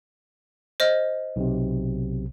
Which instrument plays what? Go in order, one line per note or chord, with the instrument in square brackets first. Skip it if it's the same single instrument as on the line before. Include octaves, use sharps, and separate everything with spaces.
[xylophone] C5 D#5 F6
[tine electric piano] B1 C3